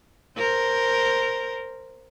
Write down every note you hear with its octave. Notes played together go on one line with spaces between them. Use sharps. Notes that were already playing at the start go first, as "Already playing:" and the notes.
A#4 C5